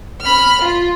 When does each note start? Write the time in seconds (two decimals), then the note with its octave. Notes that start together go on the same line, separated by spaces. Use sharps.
0.22 B5 F6
0.62 F4